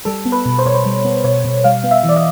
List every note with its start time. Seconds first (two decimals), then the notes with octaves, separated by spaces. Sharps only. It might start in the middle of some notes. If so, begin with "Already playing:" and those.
0.05 G3 A4
0.25 B3
0.32 B4
0.45 B2
0.59 C5
0.66 B2 C#5
0.74 C5
0.85 G3
1.05 B3
1.24 B2 C#5
1.44 B2
1.64 G3 F5
1.84 B3
1.91 E5
2.03 E3
2.09 D5
2.16 D#5